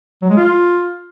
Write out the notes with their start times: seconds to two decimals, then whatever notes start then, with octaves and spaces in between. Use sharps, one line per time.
0.22 F#3
0.30 G#3
0.37 F4